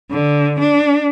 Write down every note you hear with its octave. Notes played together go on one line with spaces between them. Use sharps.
D3
D4